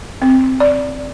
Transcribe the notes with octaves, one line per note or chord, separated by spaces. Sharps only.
C4
D5